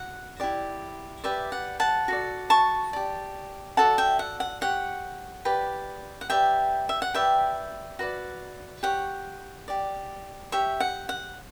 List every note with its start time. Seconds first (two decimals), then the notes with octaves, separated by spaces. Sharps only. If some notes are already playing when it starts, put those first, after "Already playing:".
Already playing: F#4 F#5
0.40 E4 G4 D5
1.24 G4 B4 D5 E5
1.52 F#5
1.80 F#5 A5
2.08 F#4 A4 D5
2.50 A5 C#6
2.93 G4 D5
3.77 F#4 A4 D5 F#5 A5
3.98 E5 G5
4.19 F#5
4.40 F#5
4.61 G4 C#5 F#5
5.45 G4 B4 D5
6.21 F#5
6.30 G4 B4 D5 E5 G5
6.89 E5
7.02 F#5
7.14 G4 B4 D5 E5 G5
7.99 F#4 B4 D5
8.83 G4 C#5 F#5
9.68 G4 D5
10.52 G4 C#5 E5
10.80 F#5
11.09 F#5